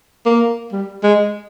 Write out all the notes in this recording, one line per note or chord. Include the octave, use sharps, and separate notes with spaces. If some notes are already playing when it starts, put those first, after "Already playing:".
A#3
G3
G#3